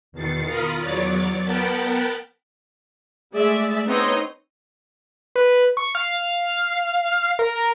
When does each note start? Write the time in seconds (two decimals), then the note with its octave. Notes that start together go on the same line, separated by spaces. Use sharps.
0.12 E2 B2 D#3 A6 C7 C#7
0.46 F4 A#4 F5 B5 D#6
0.79 E2 F#3 C#5 D5 A6
1.44 B3 A#4 F#5 G5 A5 B5
3.32 G#3 A3 G#4 D5 E5
3.87 B3 C4 D#4 C#5 D#5 C6
5.36 B4
5.77 C#6
5.95 F5
7.39 A#4